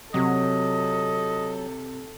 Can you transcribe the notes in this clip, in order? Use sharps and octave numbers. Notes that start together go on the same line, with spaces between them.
C3 F#3 A4 D#5